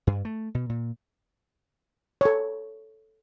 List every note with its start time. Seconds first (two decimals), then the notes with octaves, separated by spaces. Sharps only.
0.07 G2
0.25 A3
0.55 B2
0.69 A#2
2.21 A4 C#5